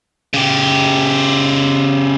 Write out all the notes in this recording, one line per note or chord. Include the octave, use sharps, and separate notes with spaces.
C#3 G4